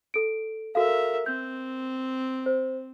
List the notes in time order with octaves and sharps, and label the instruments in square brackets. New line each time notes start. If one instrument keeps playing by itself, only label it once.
[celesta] A4 D7
[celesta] F#4 A4 F5 [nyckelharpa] A#4 E5
[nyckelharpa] C4 [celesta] G6
[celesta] C5